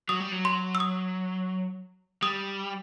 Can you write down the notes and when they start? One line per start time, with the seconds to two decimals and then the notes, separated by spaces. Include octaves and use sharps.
0.09 F#3 D#6
0.20 G3
0.32 F#3
0.45 C6
0.75 E6
0.80 D#6
2.22 G3 D#6